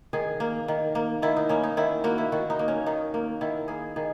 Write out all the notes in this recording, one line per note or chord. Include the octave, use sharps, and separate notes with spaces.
D#3 G#4
A#3
D#3
A#3
D#3 E4
D#4
A#3 C#4
D#4
D#3 E4
A#3 F#4
E4
D#3 F#4
D#4
A#3
C#4
D#3 D#4
A#3
D#3 E4
A#3 G#4
D#3 G#4